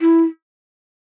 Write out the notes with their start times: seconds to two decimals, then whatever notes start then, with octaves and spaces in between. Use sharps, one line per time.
0.01 E4